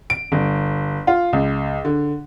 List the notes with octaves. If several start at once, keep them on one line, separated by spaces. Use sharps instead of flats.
D7
G1
F4
C#2
D3